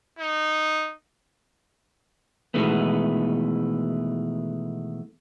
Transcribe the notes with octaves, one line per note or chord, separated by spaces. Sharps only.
D#4
B2 D#3 E3 G#3 A3 B3